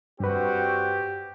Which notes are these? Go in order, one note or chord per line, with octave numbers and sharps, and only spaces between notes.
G2 G3 C4 F#4 G4 B4